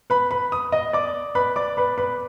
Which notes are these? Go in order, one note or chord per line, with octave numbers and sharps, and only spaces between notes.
B4 B5
B4 B5
D#6
D#5 D#6
D5 D6
B4 B5
D5 D6
B4 B5
B4 B5